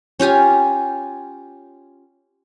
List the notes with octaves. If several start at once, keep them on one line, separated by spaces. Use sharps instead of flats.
C#4 F4 G4 G#5